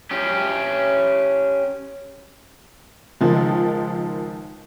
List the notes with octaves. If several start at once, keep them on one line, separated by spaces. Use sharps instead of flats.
C#4 G4
C#2 D#3 F3 G#3